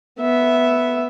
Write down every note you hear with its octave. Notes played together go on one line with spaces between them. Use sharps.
B3 E5